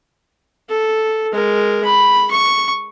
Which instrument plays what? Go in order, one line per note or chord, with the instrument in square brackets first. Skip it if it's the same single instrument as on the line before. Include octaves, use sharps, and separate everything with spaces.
[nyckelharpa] A4
G#3 A#4
B5
C#6